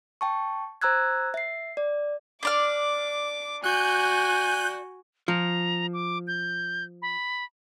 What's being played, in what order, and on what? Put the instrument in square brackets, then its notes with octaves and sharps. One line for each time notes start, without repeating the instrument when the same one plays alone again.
[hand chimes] G5 A5 C#6
C5 A#5 E6 F#6 G#6
E5 C7
D5
[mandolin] D4 D5 F6 [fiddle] D6
[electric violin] F#4 [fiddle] G#5 [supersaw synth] F#6 G6
[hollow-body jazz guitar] F3 [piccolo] A#5
[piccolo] D6
G6
B5